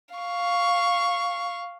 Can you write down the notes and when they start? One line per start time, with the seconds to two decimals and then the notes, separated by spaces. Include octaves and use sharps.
0.15 F5 C#6